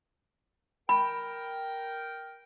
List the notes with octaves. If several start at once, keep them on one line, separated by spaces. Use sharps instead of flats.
A#4 G5 B5